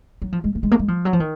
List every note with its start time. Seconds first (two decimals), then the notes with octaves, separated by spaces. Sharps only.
0.22 F#3
0.32 F3
0.44 G#3
0.55 A#3
0.63 G#3
0.71 A#3
0.79 G#3
0.88 F3
1.05 F#3
1.13 F3
1.20 D#3